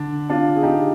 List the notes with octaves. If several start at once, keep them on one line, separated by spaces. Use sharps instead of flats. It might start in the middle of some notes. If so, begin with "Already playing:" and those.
Already playing: D3 D4
D4 F4
G#4
D#4 G4